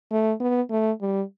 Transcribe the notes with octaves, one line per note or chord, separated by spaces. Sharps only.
A3
B3
A3
G3